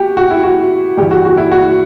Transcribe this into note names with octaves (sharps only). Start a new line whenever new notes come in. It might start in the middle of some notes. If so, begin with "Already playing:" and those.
Already playing: F#4 G4
F#4
E4
F#4
G2 E3 G4
F#4
F#4
E4
F#4